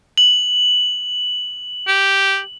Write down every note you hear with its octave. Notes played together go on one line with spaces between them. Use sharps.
F#7
G4